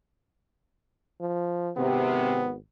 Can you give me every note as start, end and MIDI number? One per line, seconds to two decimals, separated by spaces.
1.21 1.71 53
1.77 2.56 32
1.77 2.43 48
1.77 2.53 59